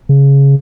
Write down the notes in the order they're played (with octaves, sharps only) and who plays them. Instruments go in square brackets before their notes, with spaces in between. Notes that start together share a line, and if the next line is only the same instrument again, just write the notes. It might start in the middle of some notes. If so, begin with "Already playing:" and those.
[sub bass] C#3